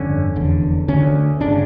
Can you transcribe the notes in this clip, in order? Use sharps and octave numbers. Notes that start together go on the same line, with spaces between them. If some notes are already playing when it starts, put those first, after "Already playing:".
Already playing: G1 F2 D3 C#4
F1 E2 D3
D2 D3 C#4
G1 C#3 D4